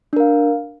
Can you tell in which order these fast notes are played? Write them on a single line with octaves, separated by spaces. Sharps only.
D4 A#4 F5